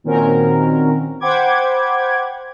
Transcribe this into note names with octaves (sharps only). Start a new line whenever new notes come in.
A#2 D#3 C4 C#4 F#4 A#4
C5 F#5 G5 B5 D6 G#6